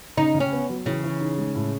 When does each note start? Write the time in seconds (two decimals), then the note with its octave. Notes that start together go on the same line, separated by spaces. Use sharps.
0.17 C#3 D#4
0.34 C#3
0.40 C#4
0.52 B3
0.69 F#3
0.86 C#3 E3
1.04 E3
1.21 D#4
1.38 G#3
1.55 A2